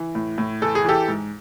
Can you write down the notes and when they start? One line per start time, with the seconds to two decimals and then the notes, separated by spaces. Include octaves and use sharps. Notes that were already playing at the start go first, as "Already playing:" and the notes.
Already playing: E3
0.15 A2
0.38 A2
0.62 E2 A4
0.75 G#4
0.85 E3 G4 A4
1.08 G#2